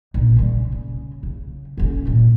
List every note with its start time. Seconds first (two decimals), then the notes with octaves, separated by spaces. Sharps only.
0.14 A#1
0.37 C#3 G3
0.72 C#3
1.23 C#3
1.77 D3 C#4
2.05 G2 A#2